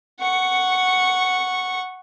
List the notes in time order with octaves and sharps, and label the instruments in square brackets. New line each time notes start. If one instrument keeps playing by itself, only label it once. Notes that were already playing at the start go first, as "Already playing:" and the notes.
[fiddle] F#5 C#6